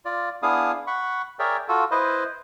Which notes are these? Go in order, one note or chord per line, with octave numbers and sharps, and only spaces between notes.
F4 D5
B3 D4 E4 G#4 F5 D#6
F#5 B5 C#6
G#4 A#4 C#5 D5 E5 G5
F4 F#4 A4
E4 B4 C5 D#5